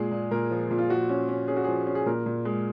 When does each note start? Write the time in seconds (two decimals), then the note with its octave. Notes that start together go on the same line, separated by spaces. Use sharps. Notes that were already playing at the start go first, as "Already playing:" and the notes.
Already playing: A#2 G#3 G#4
0.11 A#2
0.31 A#2 A#4
0.51 F3
0.70 A#2
0.78 F4
0.89 F3 F#4
1.09 C#4
1.29 C#4
1.48 C#4 G#4
1.57 F#4
1.64 F3 G#4
1.87 C#4
1.95 G#4
2.06 A#2 A#4
2.26 A#2
2.45 G#3